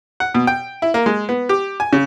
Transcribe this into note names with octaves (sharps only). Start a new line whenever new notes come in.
F#5
B2
G5
E4
A#3
G#3
B3
G4
G#5
C#3